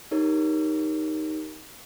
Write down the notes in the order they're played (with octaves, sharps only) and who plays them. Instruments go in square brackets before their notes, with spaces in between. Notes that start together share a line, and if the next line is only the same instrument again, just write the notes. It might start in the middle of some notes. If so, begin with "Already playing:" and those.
[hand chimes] D#4 G4 A#4 C#5